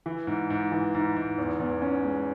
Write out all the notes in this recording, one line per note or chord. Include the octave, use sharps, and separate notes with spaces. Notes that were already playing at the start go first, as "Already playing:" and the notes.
E3
G#2
G#2
E3
G#2
G#2
E2
E2
C#4
G#3